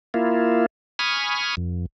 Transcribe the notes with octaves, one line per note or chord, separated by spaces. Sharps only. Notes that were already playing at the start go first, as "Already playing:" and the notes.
A#3 E4 F4
G#5 B5 C#6 D#6 F6
F2